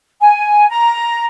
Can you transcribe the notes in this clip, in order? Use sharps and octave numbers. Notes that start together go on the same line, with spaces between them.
G#5
A#5